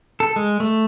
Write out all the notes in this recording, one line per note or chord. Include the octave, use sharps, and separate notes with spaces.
A4
G#3
A3